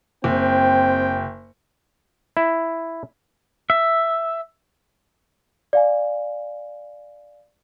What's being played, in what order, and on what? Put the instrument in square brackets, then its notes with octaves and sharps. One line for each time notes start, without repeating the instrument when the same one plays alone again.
[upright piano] F#1 [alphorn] C4 [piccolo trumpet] G5
[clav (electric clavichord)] E4
[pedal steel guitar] E5
[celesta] D5 F5 G#5